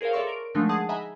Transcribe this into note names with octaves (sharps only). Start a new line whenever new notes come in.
G#4 A#4 C5 C#5 F5
A4 A#4 D5 E5 C6 C#6
A#4 D7
D3 F3 G#3 A3 D4 D#4
G#4 F#5 A5 D#6
D#5 E5 F#5 G#5 A#5 B5